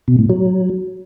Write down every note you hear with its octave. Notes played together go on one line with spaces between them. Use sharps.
B2
A2
F#3